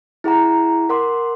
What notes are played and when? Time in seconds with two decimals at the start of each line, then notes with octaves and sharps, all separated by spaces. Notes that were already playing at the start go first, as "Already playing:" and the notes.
0.24 E4 G#4 F#5 A#5
0.89 A#4 F#5 C6 D6